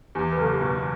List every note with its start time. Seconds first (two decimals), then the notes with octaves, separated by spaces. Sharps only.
0.15 E2 G4
0.32 B4
0.38 F#1 A4
0.49 G4
0.61 B2